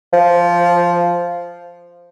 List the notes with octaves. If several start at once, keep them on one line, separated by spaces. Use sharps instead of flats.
F3